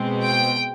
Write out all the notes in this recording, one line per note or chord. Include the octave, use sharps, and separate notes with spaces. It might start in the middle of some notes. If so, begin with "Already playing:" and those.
Already playing: B2 G#3 C4
G5